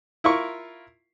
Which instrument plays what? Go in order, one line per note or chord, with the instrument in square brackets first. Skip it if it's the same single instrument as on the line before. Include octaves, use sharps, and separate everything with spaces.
[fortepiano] E4 F4 A#4 C#6